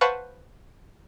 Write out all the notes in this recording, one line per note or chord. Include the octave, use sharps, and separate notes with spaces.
B4 C5 F5 F#5 A5 C#6